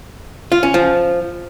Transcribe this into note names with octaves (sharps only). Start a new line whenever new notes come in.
F4
C#4
F3